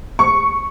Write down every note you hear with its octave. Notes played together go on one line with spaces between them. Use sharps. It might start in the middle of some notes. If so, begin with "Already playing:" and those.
C#6